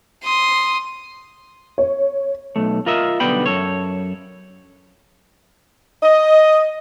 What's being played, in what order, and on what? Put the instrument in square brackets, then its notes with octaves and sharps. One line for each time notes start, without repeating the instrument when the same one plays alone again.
[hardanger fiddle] C6 D#6
[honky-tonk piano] C#5
[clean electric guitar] B1 A3
F4 A#4 D#5 E5
B1 D3 G3 B3 G5 B5
F#2 A4 C#5
[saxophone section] D#5